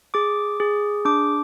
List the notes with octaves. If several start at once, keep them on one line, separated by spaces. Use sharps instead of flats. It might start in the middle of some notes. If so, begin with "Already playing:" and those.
G#4 D6
G#4
D4 D6